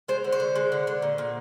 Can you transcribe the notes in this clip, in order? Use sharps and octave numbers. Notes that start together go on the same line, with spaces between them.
G#3 C5
D3
C5
D3
G#3
D3
D3
A#2
A#2